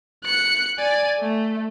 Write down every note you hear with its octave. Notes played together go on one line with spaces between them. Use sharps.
F#6 C#7
D5 G#5
A3